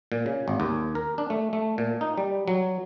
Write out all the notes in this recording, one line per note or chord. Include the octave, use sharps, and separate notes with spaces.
A#2
C#3
G#1
D#2
A#4
D4
A3
A3
A#2
D#4
G3
F#3